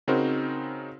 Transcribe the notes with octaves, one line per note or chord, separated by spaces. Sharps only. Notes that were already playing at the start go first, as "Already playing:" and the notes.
C#3 C4 D#4 F#4 A#4 C5